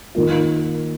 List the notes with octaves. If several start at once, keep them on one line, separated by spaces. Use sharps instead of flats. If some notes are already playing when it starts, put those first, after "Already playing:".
D#3 A#3 F4